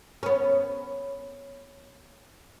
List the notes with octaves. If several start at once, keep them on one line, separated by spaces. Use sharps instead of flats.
B3 C#4